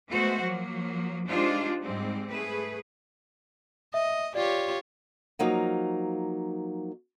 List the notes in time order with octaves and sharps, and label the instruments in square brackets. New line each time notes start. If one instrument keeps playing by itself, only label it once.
[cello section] G#3 A3 B3 F#4 C5
F3 F#3 A#3
G#3 D4 D#4 F4 G4 C5
G#2 G3 G#3 C4
A3 G#4 B4
[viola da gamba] D#5 [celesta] E5
[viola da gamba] F4 G4 C#5 [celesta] D5
[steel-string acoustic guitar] F3 F#3 A#3 D#4